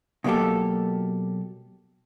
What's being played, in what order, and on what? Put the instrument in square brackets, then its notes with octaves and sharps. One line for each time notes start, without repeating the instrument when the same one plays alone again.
[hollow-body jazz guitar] B2 F#3 A#3 G4 A4